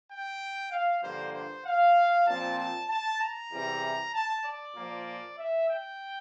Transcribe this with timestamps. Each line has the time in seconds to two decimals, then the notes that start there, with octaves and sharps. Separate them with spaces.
0.10 G5
0.72 F5
1.02 G2 D3 F3 A#3 C5
1.33 C5
1.65 F5
2.27 A#2 F3 C4 A5
2.58 A5
2.89 A5
3.20 A#5
3.52 E2 C3 E3 G3
4.14 A5
4.44 D5
4.76 A#2 F3 A#3
5.38 E5
5.70 G5